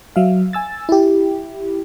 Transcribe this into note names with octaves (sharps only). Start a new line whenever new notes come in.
F#3 E5 F5
G#5 E6 A6
E4 G4